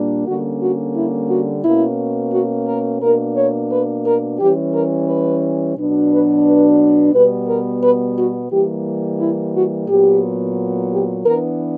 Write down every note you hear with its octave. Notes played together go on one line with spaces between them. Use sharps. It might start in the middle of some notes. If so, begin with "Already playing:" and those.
Already playing: A#2 G3 A#3 D4
D3 G3 A#3 C#4 F#4
F#4
E4
F#4
B2 A#3 C#4 E4
F#4
A#4
B2 A#3 D4 A#4
C#5
B4
A#4
E3 G3 C#4 G4
A#4
B4
B2 F#3 B3 D4
B4
B4
B2 G3 B3 B4
A#4
B4
F#4
E3 G3 A#3 G4
E4
F#4
A#2 F#3 B3 G4
G4
E3 B3 D4 A#4